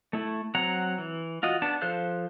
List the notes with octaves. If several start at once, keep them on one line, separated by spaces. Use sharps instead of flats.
A3 E4
F#3 C4 F#5 A#5
E3
F4 F#4 D#5
B3 D4 A5
F3 A4 C5 F5 F#6